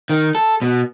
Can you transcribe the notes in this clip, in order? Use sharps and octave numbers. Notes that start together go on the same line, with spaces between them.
D#3
A4
B2